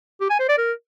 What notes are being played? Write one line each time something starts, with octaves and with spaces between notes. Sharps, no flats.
G4
G#5
C5
D5
A#4